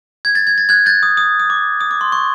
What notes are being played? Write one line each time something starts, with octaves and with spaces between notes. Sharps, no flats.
G#6
A6
G#6
A6
F#6 G#6
G6 A6
D#6
D#6
D#6
D6
D#6
D6
C6
C#6